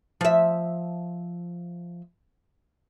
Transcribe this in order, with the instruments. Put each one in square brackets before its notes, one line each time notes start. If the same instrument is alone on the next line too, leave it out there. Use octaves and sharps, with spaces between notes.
[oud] F3 E5